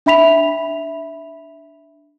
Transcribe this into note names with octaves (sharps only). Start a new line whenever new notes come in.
D4 E5 B5 B6 F7